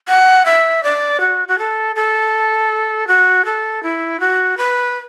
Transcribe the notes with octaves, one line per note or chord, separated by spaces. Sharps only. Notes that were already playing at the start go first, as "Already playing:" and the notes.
F#5
E5
D5
F#4
F#4
A4
A4
F#4
A4
E4
F#4
B4